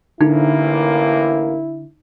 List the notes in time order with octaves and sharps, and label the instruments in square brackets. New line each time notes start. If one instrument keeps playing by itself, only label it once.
[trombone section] A1 A#3 [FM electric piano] D3 [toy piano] D#4 [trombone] E4